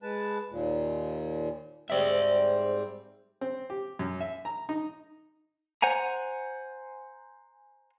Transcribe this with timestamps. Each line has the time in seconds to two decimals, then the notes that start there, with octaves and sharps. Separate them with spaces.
0.03 G#3 B4 A5
0.51 D#2 A#2
1.90 G#2 G3 C4 D5 E5
3.41 C4
3.70 G4
3.99 F#2
4.21 E5
4.45 A#5
4.69 D#4
5.82 C5 F#5 G#5 A#5